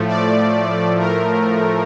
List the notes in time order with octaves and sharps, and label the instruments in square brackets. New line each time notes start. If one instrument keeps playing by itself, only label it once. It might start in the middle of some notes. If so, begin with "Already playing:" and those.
Already playing: [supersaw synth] A2 F3 A3
D5
A#4